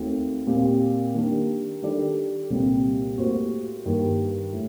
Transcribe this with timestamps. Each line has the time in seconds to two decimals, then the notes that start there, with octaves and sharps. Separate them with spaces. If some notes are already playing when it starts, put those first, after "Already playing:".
Already playing: D#2 D#3 A3 C4 F#4
0.47 A#2 G3 C4 G4
1.14 D#3 G3 A#3 D4
1.82 D#3 G3 D4 A4 D5
2.50 C2 A#2 G3 C4 G4
3.18 A2 G3 A#3 F#4 C5
3.85 G2 D#3 G3 A#3
4.53 A2